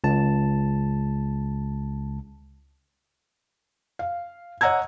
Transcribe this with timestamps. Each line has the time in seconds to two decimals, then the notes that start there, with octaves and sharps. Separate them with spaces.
0.04 C#2 A5
3.99 F5
4.61 C#5 D#5 F#5 A#5 E6 G#6